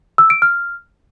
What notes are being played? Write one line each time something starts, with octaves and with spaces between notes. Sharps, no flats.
E6
D7
F6